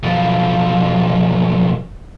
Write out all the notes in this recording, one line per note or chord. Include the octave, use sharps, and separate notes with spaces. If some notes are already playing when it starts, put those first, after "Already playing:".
B1 F3